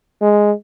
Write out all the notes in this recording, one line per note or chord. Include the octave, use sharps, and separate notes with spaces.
G#3